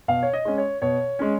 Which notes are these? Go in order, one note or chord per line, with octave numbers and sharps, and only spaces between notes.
B2 F5
C#5
D#5
G#3 C#4
C#5
B2 C#5
G#3 C#4